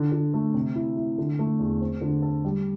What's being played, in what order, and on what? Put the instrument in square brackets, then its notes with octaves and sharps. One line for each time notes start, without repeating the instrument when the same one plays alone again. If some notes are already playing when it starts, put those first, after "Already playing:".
Already playing: [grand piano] D3
D3
A3
C3
E4
E4
D3
A3
E2
C4
D3
A4
G3